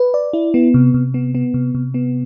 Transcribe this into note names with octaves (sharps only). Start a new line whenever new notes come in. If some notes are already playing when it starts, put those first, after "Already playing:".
Already playing: B4
D5
E4
B3
C3
C3
B3
B3
C3
C3
B3